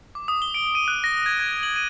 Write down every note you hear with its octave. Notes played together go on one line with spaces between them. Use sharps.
D6
D#6
G7
D7
D#7
F#6
A#6
G#6
G#6
F#7
D#7